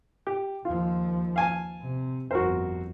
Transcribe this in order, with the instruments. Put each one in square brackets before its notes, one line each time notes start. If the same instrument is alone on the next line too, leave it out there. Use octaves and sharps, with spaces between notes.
[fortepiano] G4
[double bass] D#2 F3 [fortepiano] F4
[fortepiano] F5 G#5 A5
[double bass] C3
[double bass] G1 F2 [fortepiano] F#4 A#4 C5